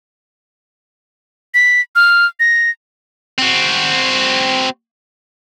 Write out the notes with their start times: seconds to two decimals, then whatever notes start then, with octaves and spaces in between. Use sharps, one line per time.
1.54 B6
1.96 F6
2.40 A#6
3.38 C4 F#4